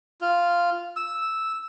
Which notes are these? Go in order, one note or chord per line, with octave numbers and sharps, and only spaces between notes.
F4
E6